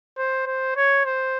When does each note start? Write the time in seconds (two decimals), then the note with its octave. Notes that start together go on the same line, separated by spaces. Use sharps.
0.17 C5
0.47 C5
0.76 C#5
1.05 C5